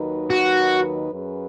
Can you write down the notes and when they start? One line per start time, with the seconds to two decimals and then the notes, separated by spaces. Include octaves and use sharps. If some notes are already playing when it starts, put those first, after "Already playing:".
Already playing: D#2 D#3 F#3 D#4 B4
0.30 F#4
1.12 F#2 F#3 C#4 G#4 B4